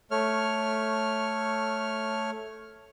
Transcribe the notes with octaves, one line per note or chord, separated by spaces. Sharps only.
A3 C#5 F6